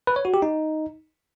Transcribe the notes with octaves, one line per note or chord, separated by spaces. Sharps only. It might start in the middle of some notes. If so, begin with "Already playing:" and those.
B4
C#5
F#4
G4
D#4